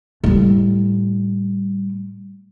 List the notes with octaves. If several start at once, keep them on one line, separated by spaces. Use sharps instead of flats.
A2 G3